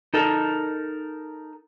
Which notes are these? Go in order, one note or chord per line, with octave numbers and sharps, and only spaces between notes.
D#4 A4 A#4